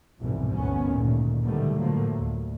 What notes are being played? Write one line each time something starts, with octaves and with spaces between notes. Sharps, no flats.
C2 F2 G#2 B2 E3
G1 D2 B3 C#4
D2 G2 A#2 D#3
B2 D3 D#3 F#3 G3 A3
A2 D3 F3 F#3 A3 A#3
D2